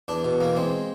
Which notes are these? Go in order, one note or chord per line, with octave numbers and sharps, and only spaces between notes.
E2 D4
B2
E2 A#3
G#3 C4